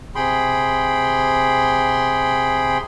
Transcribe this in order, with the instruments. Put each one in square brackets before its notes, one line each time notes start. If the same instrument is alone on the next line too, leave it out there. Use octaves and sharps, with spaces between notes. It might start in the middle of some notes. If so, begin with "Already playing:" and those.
[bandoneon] C3 G#4 G5 B5 C6